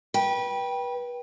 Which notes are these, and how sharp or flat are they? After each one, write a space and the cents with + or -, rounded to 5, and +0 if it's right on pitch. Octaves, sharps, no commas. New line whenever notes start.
B4 -30 G5 +0